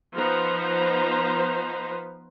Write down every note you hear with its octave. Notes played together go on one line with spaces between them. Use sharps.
F3 B3 D#4 B4 C5 A#5